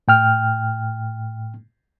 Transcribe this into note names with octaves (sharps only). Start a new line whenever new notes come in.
A2 G5 F6